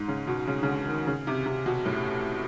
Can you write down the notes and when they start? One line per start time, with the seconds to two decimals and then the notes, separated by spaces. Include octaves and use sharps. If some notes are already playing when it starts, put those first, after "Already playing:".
Already playing: G#2
0.08 C#3
0.27 B2
0.47 C#3
0.63 C#3
0.68 D3
0.87 D#3
1.07 C#3
1.27 C3
1.46 C3
1.66 B2
1.85 A2